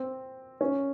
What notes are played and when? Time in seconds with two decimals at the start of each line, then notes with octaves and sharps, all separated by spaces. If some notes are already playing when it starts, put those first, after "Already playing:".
Already playing: C4
0.61 C#4